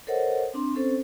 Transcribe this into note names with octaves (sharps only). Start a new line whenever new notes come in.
A4 A#4 C5 C#5 D#5 F#5
C4 D4 C6
C4 C#4 A4 C5